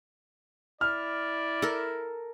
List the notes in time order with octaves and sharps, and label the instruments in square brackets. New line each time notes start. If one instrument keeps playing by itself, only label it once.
[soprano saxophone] E4 [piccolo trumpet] D5 [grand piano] F6
[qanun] A4 A#4